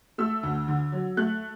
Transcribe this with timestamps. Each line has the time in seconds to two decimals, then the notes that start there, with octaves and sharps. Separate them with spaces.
0.18 A3 E6
0.43 D2
0.68 D3
0.92 F#3
1.17 A3 F#6